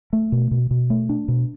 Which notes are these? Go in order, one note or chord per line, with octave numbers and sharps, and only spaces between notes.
A3
B2
B2
B2
A3
D4
B2